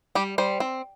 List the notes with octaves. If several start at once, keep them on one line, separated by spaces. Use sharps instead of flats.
G3 G4
G3 C5
C4